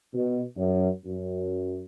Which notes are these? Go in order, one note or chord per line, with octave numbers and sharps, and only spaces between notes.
B2
F#2
F#2